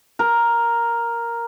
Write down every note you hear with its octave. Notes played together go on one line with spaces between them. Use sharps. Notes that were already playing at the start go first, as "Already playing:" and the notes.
A#4